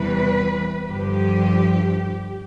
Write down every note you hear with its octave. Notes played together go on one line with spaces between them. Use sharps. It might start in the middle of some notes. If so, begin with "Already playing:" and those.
Already playing: E2 C3 E3 G3 B4
G2 D3 F3 G4